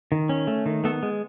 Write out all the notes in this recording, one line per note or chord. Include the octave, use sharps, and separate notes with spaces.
D#3
C#4
A3
D#3
A3 B3 A4
G#3